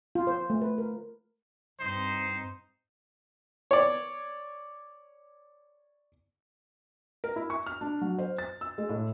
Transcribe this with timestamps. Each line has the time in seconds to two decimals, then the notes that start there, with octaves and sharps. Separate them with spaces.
0.15 F4
0.27 C5
0.50 A3
0.62 B4
0.78 A#4
1.80 G2 C4 D#4 C5
3.71 C#5 D5
7.24 A#4
7.36 E4
7.50 C#6
7.66 F6
7.81 D4
8.01 F#3
8.18 C5
8.38 A6
8.61 E6
8.78 G#3
8.89 A2